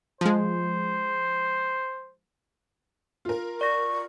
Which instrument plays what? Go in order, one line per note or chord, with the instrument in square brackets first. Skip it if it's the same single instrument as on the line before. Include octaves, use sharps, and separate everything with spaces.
[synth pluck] F3 G#3 [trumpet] C5
[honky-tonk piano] F4 A#4
[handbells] D5 A#6 [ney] C#6